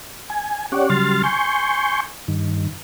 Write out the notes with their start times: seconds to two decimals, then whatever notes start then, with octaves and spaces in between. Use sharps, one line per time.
0.30 G#5
0.72 C#4 G4 C#5 D5 F#5
0.90 C#3 F#3 G3 C6 F6 A6
1.24 G#5 C6 C#6 G6
2.28 G2 D#3